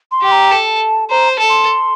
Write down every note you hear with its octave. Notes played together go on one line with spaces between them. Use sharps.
C6
G4
A#5
A4 A5
C5 A#5
A4
C6